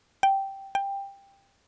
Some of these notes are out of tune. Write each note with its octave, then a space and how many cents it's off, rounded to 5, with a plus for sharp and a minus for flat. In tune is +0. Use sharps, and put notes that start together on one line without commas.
G5 -5
G5 +15